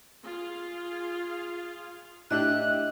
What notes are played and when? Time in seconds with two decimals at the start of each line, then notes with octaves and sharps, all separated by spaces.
0.22 F4 G#4 F5
2.31 A2 D4 G4 D#5 E5 E6 F#6